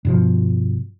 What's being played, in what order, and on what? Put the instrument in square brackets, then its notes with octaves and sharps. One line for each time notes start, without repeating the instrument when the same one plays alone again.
[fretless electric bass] G2 B2 F3